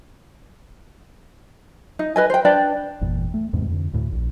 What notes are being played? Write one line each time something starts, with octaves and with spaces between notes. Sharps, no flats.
D#4
B4 D#5 G#5
C5 G5
D4 B4 D5 G5
G1 E2 A#2
A3
E2 G#2 C3
F2 D3
D2 A2
A#1